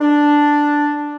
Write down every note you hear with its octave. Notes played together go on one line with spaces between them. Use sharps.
D4